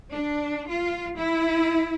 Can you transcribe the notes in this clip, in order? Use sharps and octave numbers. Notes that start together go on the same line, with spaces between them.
D4
F4
E4